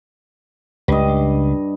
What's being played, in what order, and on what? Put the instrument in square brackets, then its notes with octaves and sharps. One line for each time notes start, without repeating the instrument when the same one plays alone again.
[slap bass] C#2 [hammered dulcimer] G2 D#5